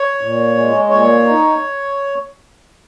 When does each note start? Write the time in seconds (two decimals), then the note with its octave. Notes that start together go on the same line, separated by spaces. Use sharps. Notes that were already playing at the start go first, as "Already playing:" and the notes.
Already playing: C#5
0.21 A#2
0.55 G#3
0.90 A#2 C#5
1.25 D#4